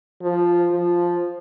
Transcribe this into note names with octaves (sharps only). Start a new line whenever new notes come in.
F3
F3